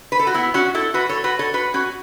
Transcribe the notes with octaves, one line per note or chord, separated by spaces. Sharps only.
B4
A4
F#4
B3 E4
C#4 F#4
E4 A4
F#4 B4
A4 C#5
F#4 B4
A4 C#5
F#4 B4
C#4 F#4